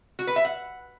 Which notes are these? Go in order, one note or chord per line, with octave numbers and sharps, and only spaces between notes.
F#4
B4
E5
F#5